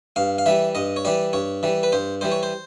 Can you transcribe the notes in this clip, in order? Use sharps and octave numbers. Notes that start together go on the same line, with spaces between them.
G2 F5
F5
E3 G3 E5
G2 D#5
C#5
E3 G3 D5
G2 C#5
E3 G3
B4
G2 C5
E3 G3 C5
C#5
C5